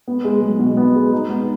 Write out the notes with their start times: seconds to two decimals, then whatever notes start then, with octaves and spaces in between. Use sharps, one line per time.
0.08 B3
0.24 G#3
0.42 B1
0.59 B2
0.77 B3
0.95 G#3
1.12 D#4
1.30 B3